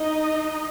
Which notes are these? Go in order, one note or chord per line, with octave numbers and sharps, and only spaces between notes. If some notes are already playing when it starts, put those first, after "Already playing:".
Already playing: D#4 D#5